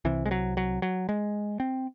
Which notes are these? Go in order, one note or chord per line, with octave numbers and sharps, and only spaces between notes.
C2 C3 E3
G#3
F#3
F#3
F#3
G#3
C4